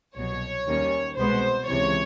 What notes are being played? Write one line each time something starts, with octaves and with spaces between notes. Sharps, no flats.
C2 B2 F#3 C#5
D#2 D#3 G3 A#3 C#4
C2 B2 G#3 B3 C5
C#2 C3 E3 C#5